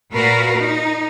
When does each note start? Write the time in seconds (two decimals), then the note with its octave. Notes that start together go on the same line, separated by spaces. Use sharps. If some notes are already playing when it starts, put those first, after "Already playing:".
0.12 A#2 F#4 A#4 B4 F5
0.58 D#4